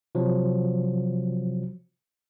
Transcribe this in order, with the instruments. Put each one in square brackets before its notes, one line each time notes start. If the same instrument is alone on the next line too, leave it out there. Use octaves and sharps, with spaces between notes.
[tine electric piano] C3 F3 F#3